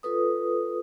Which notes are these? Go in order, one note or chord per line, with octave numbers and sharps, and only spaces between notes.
F4 A4 B4 D#6